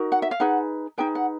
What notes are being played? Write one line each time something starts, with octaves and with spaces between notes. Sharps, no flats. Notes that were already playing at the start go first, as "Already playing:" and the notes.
Already playing: D#4 F#4 A#4
F#5
E5
F5
D#4 G#4 B4 F#5
D#4 G#4 B4 G5
F#5